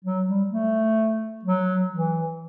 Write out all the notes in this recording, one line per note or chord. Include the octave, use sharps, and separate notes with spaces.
F#3
G3
A3
F#3
E3